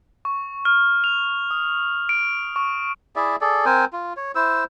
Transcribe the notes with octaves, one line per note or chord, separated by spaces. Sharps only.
C#6
F6
F7
D#6
D7
C#6
E4 G#4 D5 E5
G#4 A4 D5
C4 A#4 C5 G#5
F4
C#5
E4 C5 E6